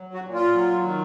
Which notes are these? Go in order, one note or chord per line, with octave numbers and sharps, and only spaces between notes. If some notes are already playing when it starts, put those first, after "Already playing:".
Already playing: F#3
F#4
A#2
F4
F#3
D#3